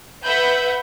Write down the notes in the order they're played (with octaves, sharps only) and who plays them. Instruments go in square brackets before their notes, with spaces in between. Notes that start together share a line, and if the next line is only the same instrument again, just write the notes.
[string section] B4 E5 F#5 B5 G6